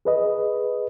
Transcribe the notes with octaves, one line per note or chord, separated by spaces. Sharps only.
G#4 B4 D#5